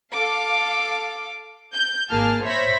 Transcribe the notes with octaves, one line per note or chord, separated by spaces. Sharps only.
A4 F5 D6
G6
G#1 A#3 G#4 A5 F6
C5 C#5 E5 B5 A#6 B6